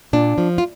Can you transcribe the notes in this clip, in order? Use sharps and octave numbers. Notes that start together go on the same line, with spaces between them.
A#2 D4
F3
F4